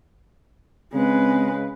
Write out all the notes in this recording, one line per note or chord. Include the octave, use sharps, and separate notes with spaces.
C#3 G#3 C4 B4